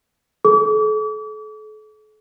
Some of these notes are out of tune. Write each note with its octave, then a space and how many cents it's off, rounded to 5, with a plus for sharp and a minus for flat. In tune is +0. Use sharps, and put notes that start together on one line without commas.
A4 -40 D6 -40